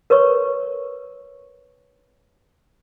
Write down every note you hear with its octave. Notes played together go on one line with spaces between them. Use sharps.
A#4 B4 C#5 C#6